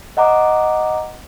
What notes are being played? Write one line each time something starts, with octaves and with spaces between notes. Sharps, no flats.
D#5 F#5 A#5 D6